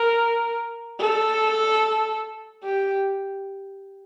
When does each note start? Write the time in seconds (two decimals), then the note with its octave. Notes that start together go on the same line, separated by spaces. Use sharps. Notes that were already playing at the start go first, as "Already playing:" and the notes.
Already playing: A#4
1.00 A4
2.64 G4